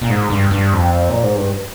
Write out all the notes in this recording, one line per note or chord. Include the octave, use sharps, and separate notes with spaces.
A#2
G#2
G2
G2
F2
A#2
G#2
G2